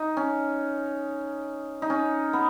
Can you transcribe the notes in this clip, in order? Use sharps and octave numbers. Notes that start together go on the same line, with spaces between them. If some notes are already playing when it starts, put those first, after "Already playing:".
Already playing: D#4
C#4
D#4
C#4
B3